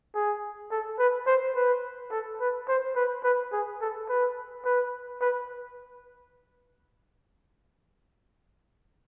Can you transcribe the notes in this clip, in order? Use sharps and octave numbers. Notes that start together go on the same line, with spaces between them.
G#4
A4
B4
C5
B4
A4
B4
C5
B4
B4
G#4
A4
B4
B4
B4